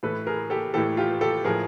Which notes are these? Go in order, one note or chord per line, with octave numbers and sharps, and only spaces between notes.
A2 E3 A4 B4
G#4 A#4
G4 A4
A2 E3 G4 A4
F4 G4
G4 A4
A2 F3 G#4 A#4